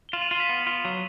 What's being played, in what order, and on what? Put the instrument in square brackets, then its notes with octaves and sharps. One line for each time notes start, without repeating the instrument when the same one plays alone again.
[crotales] G7
[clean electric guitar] F4 [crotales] E7 F#7
[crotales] D#7 F7
[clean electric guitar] F4 [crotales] C7
[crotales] B6
[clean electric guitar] B3
F4
F#3